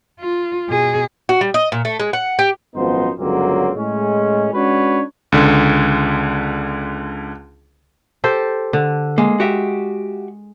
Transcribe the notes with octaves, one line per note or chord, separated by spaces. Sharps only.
F4
B2 G#4
F#4
G3
D#5
A#2
A3
G#3
F#5
G4
G#1 F#2 F3 B3 D#4 C5
G1 C#2 D3 F#3 A#3 C4
A2 G#3 C#4
G#3 C#4 D4 F#4 B4 C#5
C#2 D3
G4 A4 C5
D3
G#3 A#3
F#4 G4 E5